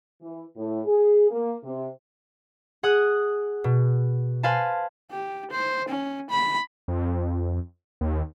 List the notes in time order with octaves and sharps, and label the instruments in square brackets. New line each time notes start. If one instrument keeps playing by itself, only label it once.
[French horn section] E3
A2
G#4
A#3
C3
[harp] G#4 F#5 D#6 F#6
B2
B4 C5 F5 G#5 A5
[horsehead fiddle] G4
C5
C#4
B5
[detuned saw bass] F2
D#2